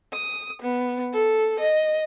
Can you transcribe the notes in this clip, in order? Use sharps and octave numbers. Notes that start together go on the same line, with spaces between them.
D#6
B3
A4
D#5